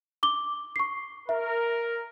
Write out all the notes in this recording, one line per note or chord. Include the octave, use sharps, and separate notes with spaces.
D6 G7
C#6 C7
A#4 E5